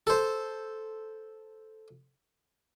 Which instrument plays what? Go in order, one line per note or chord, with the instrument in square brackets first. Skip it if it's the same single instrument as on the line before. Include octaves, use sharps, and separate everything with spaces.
[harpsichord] A4 C5